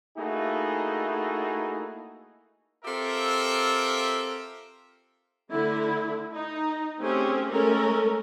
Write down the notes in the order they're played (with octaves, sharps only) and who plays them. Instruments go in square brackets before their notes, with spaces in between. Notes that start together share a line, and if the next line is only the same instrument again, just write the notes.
[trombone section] A3 A#3 D#4 E4 F#4 G#4
[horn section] C4 F4 G4 A4 A#4 E5
[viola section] D3 A3 E4
D#4
A3 C4 C#4 G4 G#4
G#3 A3 C#4 A4 A#4